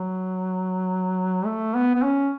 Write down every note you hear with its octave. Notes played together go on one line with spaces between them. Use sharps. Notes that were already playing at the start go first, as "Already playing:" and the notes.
Already playing: F#3
A3
B3
B3
C#4